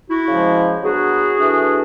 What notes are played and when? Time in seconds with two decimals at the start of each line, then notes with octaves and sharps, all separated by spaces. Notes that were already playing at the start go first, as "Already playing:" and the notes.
0.09 E4 F#4
0.28 C#3 F3 G#3
0.82 F#3 B3 D4 F#4 G#4
1.38 E3 A3 D4